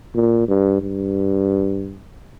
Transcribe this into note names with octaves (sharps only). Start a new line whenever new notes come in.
A#2
G2
G2